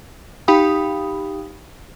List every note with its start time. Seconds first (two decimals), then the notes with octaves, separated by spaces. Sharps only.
0.48 D#4 G4 F5 G5 B5 D#6